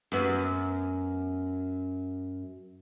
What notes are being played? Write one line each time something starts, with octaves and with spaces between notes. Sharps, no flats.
F#2 B3